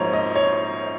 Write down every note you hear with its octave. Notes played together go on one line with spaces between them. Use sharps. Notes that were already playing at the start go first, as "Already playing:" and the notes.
Already playing: A#1 G#2 F3 A#3 C5 C#5
D#5
C#5